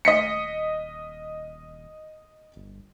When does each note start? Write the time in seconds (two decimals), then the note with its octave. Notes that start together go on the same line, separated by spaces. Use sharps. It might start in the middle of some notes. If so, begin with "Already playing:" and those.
0.05 D#1 D#5 B6 C#7
2.56 G1